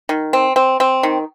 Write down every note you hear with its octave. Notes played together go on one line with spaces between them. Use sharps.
D#3
C4
C4
C4
D#3